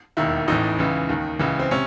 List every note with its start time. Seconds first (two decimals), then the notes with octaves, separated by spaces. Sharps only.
0.17 E1 D#2 D#3 E4
0.48 A1 A2 E3 D#4
0.78 C#2 C#3 E3
1.09 D#2 D#3
1.39 C#2 C#3 E3
1.59 C4
1.71 C3 C#4